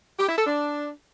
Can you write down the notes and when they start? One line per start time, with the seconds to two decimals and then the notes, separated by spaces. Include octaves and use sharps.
0.18 G4
0.28 E4
0.37 A4
0.46 D4